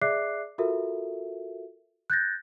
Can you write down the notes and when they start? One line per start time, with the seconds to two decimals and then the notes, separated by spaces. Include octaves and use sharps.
0.01 G#4 D5 E5 D6 F#6 C7
0.58 F4 F#4 A4 A#4 E5
2.10 F#6 G6 A6 A#6